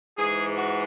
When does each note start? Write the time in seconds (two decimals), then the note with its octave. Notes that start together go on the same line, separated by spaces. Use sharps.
0.17 G#2 E3 G#3 G#4
0.56 F#4